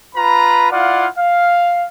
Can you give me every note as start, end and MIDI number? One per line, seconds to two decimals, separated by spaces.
0.15 0.69 65
0.15 0.69 71
0.15 0.69 82
0.15 0.69 83
0.71 1.07 64
0.71 1.07 65
0.71 1.07 74
0.71 1.07 77
0.71 1.07 78
1.17 1.86 77